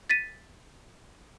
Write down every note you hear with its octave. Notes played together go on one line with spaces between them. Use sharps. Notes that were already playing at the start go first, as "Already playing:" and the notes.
A6 B6 D#7